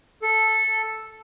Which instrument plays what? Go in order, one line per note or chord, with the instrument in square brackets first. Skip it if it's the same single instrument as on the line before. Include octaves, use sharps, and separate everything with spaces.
[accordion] A4